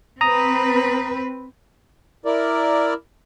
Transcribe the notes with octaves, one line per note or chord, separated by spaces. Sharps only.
C4 B4 A#5 D#6
E4 A#4 D5